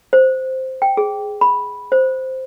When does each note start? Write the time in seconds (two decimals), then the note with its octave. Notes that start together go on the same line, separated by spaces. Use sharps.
0.13 C5
0.82 G5
0.97 G#4
1.41 B5
1.92 C5